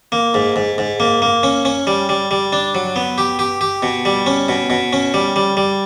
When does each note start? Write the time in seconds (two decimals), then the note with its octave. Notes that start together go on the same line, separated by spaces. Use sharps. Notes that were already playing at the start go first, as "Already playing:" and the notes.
0.12 A#3
0.34 G#2
0.56 G#2
0.78 G#2
1.00 A#3
1.22 A#3
1.43 C#4
1.65 C#4
1.87 G3
2.09 G3
2.31 G3
2.53 D4
2.75 F#3
2.96 B3
3.18 G4
3.39 G4
3.61 G4
3.83 B2
4.05 G3
4.26 C#4
4.48 B2
4.70 B2
4.93 C#4
5.14 G3
5.36 G3
5.57 G3